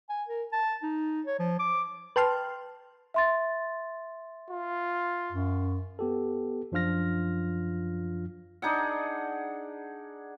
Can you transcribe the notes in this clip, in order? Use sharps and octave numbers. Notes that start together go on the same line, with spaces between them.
G#5
A#4
A5
D#4
C#5
F3
D6
B4 G5 A5 C6 F6
E5 C6 A6
F4
F#2
B3 G4 A4
F#2 F3 D4 F4 F6 A#6
D4 D#4 G#4 F#5